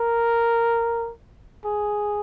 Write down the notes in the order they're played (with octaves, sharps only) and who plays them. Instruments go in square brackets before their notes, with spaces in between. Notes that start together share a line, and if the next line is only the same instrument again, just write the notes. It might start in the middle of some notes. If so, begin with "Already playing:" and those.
Already playing: [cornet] A#4
G#4